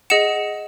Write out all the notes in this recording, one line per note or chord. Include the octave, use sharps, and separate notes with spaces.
G#4 D#5 F#5 C#7 E7